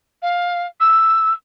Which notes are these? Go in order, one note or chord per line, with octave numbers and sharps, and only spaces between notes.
F5
E6